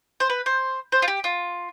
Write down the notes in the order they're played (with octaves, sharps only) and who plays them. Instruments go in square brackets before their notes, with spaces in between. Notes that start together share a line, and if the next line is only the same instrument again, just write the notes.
[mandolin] C5
B4
C5
C5
F4
G4
F4